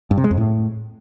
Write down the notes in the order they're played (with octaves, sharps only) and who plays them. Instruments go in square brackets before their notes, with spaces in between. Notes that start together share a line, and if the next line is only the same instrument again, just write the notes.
[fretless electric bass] G2
C3
G#3
F2
A2